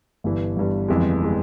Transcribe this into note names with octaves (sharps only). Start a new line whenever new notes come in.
G1 G2 E3
G1 G2 E3
G1 F2 E3 G#3
E3 G#3